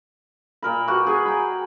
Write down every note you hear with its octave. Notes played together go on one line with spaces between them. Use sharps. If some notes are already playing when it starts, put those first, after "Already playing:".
A#2 A#4 B5
F#4 G4 B4 F#5
G#4 G#5
G5 A#5 B5